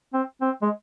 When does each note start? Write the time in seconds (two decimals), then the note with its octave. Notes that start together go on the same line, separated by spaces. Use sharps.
0.13 C4
0.42 C4
0.62 G#3